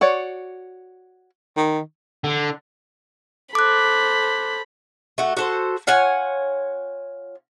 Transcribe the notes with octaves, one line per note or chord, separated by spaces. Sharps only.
F#4 C#5 D5
D#3
D3
A4 C5 B5 D6 F#6
A3 F#4
F#4 A4 C5
F4 C#5 F#5 G#5